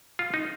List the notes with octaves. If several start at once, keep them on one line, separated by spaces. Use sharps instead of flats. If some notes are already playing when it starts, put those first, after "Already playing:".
F4
D#4